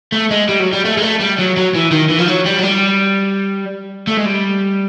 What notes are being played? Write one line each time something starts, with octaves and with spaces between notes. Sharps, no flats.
A3
G#3
G3
F#3
G3
A3
G#3
A3
G3
F#3
F#3
E3
D#3
E3
F3
F#3
G3
F#3
G3
A3
G#3
G3